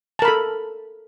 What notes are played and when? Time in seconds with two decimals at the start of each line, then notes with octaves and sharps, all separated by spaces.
0.19 A5
0.22 A#4
0.25 B5
0.28 A4